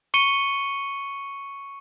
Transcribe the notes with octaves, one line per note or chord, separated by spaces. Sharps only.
C#6 C#7 D#7 G7